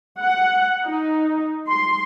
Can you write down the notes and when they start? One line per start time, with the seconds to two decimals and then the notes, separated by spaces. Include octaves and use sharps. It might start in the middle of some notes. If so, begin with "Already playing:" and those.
0.19 F#5
0.83 D#4
1.70 C6